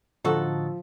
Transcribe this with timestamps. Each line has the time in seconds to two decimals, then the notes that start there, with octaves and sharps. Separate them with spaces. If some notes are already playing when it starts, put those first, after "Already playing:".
0.24 A2 D3 F3 D#4 F#4 A4